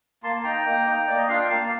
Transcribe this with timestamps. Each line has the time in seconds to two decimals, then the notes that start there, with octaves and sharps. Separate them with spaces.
0.23 A#3 A5 C6
0.36 A5
0.44 D#4 G5 A#5
0.66 A#3
0.86 D#4
1.07 A#3 D5
1.18 D#5
1.28 D4 F4 F5
1.39 G5
1.49 A#3 F5 A5